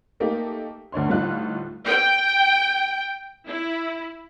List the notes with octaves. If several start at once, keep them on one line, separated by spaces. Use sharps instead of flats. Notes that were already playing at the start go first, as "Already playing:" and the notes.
A3 A#3 D#4 G4
D2 D4 C#5 C6
D2 A2 G3 D#4 F4 F#6
G5
E4